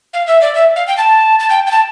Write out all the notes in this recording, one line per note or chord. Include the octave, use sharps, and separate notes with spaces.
F5
E5
D5
E5
F5
G5
A5
A5
G5
G5
A5